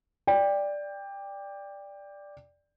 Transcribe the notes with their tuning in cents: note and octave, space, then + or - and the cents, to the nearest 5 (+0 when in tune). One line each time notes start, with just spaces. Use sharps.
D5 +0 G5 +20